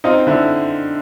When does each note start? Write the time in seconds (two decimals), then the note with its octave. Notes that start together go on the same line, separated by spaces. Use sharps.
0.04 C4 D#4 F4
0.27 D3 E4